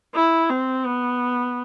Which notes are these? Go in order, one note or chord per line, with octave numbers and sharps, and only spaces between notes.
E4
C4
B3